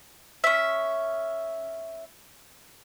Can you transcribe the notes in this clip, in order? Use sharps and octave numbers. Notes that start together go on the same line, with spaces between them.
C#4 E5